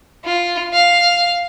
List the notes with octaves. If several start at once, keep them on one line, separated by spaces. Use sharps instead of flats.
F4
F5